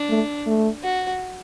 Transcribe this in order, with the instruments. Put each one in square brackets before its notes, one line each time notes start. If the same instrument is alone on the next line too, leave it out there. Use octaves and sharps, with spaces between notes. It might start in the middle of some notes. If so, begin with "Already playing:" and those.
Already playing: [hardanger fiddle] D4
[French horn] A3
A3
[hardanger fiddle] F#4